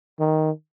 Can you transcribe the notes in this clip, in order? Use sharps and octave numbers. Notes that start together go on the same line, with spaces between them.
D#3